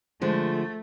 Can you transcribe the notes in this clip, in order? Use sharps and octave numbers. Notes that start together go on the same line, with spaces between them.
D3 F3 G#3 A3